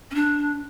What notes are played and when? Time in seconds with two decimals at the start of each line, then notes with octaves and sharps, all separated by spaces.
0.11 C#4
0.15 D4